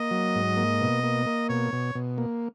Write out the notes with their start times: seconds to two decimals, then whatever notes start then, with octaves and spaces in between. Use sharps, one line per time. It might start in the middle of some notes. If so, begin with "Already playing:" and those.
Already playing: A#3 D#5
0.11 F#3
0.35 G#2
0.57 A#3
0.81 B2
1.03 A#3
1.26 A#3
1.49 B2 C#5
1.73 B2
1.95 B2
2.18 A#3